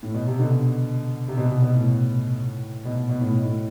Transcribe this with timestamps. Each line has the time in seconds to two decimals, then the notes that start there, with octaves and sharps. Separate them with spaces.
0.03 A2
0.14 B2
0.27 C3
0.39 B2 D3
1.28 C3
1.37 B2
1.50 B2
1.62 B2
1.74 A2
2.85 B2
3.09 B2
3.21 A2
3.44 A2